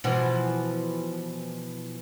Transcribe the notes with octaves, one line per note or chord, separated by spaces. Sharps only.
B2 E3 F3